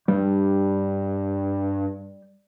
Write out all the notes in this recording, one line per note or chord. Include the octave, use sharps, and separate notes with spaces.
G2 G3